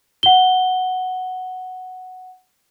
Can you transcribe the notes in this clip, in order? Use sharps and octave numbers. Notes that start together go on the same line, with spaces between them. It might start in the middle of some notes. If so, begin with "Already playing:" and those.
F#5 G7